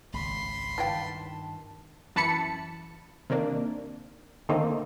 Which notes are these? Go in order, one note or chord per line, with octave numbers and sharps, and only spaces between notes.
G#1 C#2 C#3 B5 C6
G2 D#3 E3 F4 G5 A5
F#2 E3 A5 B5 C#7
C3 D#3 A#3 D4
D3 D#3 A3 A#3 C4 D#4